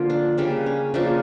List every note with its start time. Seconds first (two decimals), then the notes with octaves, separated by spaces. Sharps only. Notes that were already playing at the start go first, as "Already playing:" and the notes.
Already playing: D3 F3 A#3 F4
0.10 D4
0.38 C#3 G3 A#3 D4
0.66 C#4
0.94 C#3 F3 A#3 D4